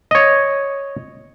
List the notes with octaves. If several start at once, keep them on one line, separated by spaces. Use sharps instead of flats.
C#5 D#5